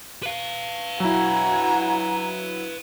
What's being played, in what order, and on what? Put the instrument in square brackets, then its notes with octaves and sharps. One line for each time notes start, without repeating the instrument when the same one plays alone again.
[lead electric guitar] B4 F5
[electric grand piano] F#3 E4 [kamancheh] F#4 G#5 [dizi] A#5